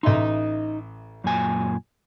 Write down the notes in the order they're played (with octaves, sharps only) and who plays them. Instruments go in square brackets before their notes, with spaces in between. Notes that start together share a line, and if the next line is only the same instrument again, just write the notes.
[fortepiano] A1 E5 C6 [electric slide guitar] D#4 D#5
[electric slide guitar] F#2 A#2 G#5